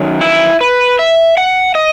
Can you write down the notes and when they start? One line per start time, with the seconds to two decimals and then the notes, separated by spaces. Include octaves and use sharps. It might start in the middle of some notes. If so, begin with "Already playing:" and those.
Already playing: F#2 D#3 F#3
0.21 E4
0.61 B4
0.99 E5
1.37 F#5
1.75 D#5